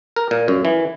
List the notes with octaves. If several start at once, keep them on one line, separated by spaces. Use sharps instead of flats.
A#4
A#2
F#2
E3